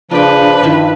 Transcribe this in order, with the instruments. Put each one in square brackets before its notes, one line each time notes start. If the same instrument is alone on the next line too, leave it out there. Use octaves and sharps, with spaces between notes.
[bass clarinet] C#3 [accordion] F3 D4 [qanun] F4 G5 [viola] B4
[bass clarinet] G2 [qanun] D#3 E4 F4